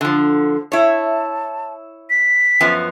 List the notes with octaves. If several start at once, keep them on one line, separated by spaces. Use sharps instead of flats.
D3 F3
E4 C#5 A5
B6
F#2 F3 B3